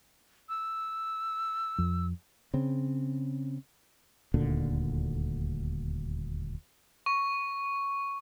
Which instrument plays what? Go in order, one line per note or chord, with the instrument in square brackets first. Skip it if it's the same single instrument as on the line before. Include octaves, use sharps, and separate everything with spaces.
[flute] E6
[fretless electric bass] F2
[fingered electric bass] C#3 C4
[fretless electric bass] D#1 D2 A#2 D3
[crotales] C#6